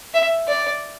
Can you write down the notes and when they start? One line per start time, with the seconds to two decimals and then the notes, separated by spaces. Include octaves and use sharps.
0.14 E5
0.48 D5